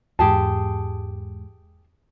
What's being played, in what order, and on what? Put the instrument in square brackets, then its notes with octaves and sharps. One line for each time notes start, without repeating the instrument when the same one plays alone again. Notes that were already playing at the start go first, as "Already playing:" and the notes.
[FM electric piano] E2 G#2 [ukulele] G4 G#4 A5